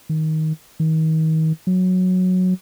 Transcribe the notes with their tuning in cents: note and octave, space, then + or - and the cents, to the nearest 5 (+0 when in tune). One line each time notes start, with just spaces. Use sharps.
D#3 +15
D#3 +35
F#3 -10